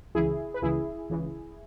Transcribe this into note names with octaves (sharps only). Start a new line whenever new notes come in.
C#2 C#3 E3 E4 G#4
B4
C#2 C#3 E3 E4 G#4
C#2 C#3 E3